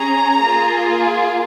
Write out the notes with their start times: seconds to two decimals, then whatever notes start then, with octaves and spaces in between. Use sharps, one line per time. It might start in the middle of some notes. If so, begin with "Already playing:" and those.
Already playing: C#4 G#4 A#5
0.43 A#3 F4 G#4